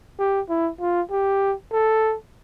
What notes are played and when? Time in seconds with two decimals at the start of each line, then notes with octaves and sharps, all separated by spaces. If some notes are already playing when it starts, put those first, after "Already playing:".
0.19 G4
0.49 E4
0.80 F4
1.11 G4
1.72 A4